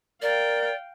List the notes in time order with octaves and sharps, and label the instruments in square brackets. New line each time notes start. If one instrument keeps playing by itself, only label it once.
[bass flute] A#4 [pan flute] D5 [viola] F5 G5